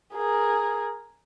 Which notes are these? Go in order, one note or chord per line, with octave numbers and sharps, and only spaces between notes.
G#4 A#4